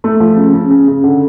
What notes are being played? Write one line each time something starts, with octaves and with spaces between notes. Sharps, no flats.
A3
F3
C#3
C#3
C#3
C#3
D3